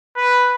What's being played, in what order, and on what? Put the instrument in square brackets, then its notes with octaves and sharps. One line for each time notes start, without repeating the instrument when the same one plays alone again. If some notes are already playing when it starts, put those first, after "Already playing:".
[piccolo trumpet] B4